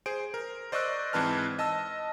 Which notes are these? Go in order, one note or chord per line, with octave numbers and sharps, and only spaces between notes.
G#4 C5 D7
A#4
C5 D5 D#5 C#6 E6 F#6
G#2 E3 C4 B4 A5 F6
D#5 A5 E6